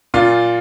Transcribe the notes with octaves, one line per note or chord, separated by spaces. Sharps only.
A#2 F4